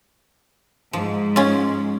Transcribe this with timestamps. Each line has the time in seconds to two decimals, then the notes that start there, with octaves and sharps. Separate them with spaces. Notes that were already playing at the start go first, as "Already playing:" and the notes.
0.93 G#2 F3
1.36 C#4 F4